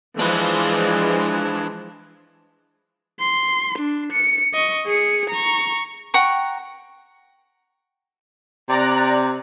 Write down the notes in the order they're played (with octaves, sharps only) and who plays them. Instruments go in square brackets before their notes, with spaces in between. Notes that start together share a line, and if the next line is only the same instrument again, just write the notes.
[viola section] E3 F3 G#3 [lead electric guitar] D4 B4
[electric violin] C6
D4
C#7
D#5 C#6
G#4 C#7
A#5 C#6
[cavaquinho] F#5 G5 A#5 C#6
[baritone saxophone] C3 [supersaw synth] D5 A#5 F#6